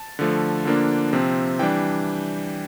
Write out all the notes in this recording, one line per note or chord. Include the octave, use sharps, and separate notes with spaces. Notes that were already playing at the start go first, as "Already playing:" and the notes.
Already playing: A5
D3 F3 A3
D3 F3 A#3 D4
C3 F3 C4
E3 G3 D4 G5